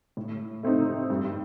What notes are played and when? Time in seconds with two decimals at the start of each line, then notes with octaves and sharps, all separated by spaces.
0.17 A2
0.63 A3 C4 D#4
1.10 G2